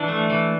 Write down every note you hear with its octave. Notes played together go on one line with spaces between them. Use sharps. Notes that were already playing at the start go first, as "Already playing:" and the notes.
Already playing: E3 D4
A3
E3